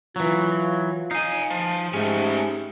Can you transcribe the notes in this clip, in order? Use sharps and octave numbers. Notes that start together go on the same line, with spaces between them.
E3 F#3 F4
D#4 F5 G#5
F3
G#2 A3 C#4 G4